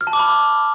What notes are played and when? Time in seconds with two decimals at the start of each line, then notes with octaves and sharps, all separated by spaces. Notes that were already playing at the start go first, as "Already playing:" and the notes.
0.01 F6
0.07 A5
0.13 D6
0.19 B5